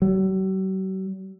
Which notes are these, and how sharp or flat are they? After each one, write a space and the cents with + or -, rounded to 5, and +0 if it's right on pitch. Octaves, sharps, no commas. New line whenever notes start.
F#3 +45